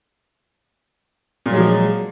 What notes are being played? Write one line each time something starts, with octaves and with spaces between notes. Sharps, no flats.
A#2 F3 F#3 G#3